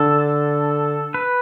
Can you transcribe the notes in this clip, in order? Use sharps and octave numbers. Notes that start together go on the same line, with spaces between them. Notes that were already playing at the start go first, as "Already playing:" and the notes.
Already playing: D3 A4
B4